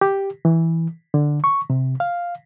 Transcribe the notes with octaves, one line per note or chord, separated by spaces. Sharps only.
G4
E3
D3
C#6
C3
F5